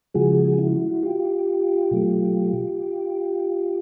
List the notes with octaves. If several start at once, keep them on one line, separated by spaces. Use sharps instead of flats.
C#3 F3 G#3 F#4 G#4
E4 F#4
F4 G4
B2 F#3 A3